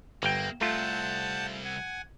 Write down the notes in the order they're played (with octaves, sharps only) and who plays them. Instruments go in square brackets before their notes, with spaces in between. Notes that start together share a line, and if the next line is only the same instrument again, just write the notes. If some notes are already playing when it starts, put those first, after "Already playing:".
[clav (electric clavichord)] G1 G5 [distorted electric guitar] A#3
[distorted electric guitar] C2 [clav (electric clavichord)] A3 F4 [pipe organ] F#5 A5 G6
[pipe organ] F#5 G#5